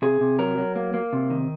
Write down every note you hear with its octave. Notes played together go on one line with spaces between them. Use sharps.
C3 G#4
C3
F#3 A#4
F#3
A#3
A#3
C3
D#3